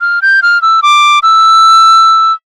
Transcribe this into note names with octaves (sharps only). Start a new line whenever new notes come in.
F6
G6
F6
E6
D6
E6